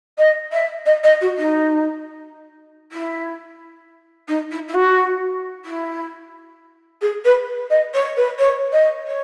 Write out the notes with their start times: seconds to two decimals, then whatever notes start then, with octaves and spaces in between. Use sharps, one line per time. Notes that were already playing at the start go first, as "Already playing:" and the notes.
0.18 D#5
0.52 E5
0.85 D#5
1.03 D#5
1.21 F#4
1.37 D#4
2.92 E4
4.28 D#4
4.51 E4
4.68 E4
4.74 F#4
5.65 E4
7.01 G#4
7.24 B4
7.70 D#5
7.93 C#5
8.16 B4
8.39 C#5
8.72 D#5
9.07 C#5